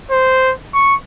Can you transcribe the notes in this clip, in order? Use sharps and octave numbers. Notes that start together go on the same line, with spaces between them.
C5
C#6